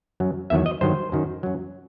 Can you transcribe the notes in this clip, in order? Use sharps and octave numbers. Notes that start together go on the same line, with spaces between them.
F#2 F#3
E2 D#3 F#3 E5
D#5
G2 D#3 F#3 C5
F#2 D#3 F#3
F#2 F#3